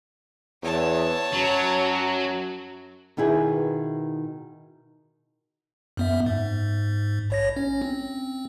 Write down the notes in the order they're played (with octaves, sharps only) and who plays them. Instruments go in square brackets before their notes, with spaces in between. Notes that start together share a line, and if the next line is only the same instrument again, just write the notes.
[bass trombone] E2 [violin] C#5 A5
[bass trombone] F#2 [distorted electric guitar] F#3
[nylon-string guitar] B2 D#3 E4 G#4 B4
[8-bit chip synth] F#2 B3 E5
G#2
A#1 C#5 A#6
C#4
C4